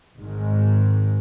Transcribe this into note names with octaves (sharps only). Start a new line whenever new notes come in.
G#1 G#2 D#3 G#3